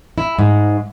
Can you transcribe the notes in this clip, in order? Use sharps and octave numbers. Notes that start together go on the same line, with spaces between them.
E4
G#2